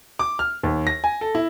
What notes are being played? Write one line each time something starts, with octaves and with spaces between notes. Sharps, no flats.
D6
F6
D#2
A#6
G#5
A4
E4